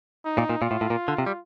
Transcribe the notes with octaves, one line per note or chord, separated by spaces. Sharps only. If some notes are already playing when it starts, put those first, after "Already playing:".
D#4
A#2
A#2
A#2 F4
A2
A2
A#2
D3
C3
G3